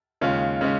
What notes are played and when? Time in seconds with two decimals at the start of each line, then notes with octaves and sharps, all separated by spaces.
0.21 D#2 C#3 G#3 C#4 F4
0.61 C#3 G#3 C#4